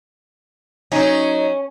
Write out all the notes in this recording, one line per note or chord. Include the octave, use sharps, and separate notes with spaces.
F#3 C#4 D#4